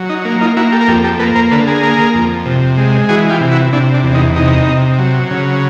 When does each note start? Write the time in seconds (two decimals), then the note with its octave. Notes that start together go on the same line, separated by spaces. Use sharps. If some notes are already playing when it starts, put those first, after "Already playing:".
Already playing: F#3
0.09 D#4
0.25 A#3
0.41 D#4 F4
0.57 A#3 E4 F#4
0.72 G4 A4
0.81 A#4
0.88 F2 G4 A4
1.04 G4 A4
1.19 A#3 A4 B4
1.35 A#4 C5
1.51 D3 A4 B4
1.67 G#4 A#4
1.83 A#3
2.15 F2
2.46 C3
2.78 G#3
3.09 E3 F#4 G#4
3.30 F4 G4
3.41 C3
3.51 E4 F#4
3.72 C3 D4 E4
3.94 D4
4.04 E2
4.15 D#4
4.36 C3 D#4
4.67 C3
4.98 F#3
5.31 C#3